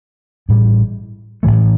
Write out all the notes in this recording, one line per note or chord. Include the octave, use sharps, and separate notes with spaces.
A1 A2 G3
A1 A2 E3 A3